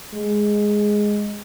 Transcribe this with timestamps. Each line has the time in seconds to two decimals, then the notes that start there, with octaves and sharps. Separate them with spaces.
0.14 G#3